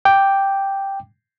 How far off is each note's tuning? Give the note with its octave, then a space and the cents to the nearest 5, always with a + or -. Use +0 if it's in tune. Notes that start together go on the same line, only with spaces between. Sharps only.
G5 +0 D6 +0